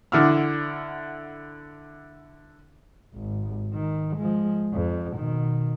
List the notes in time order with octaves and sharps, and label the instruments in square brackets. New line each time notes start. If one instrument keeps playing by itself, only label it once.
[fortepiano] D3 D4 E4 F#5 E6 F6
[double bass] G#1
D#3
F3 G#3
F2
B2 D#3